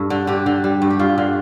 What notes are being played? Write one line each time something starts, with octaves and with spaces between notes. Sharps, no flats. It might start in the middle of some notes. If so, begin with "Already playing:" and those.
Already playing: G2 A4
D3
D3 G4
D3
G3
G2
G4
G2 F4
D3